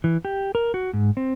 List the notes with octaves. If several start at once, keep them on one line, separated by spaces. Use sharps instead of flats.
E3
G4
A#4
F#4
G#2
C4